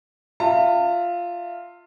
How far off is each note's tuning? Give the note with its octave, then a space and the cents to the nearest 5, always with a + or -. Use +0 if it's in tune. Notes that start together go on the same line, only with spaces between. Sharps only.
F4 +0 E5 +0 A5 +45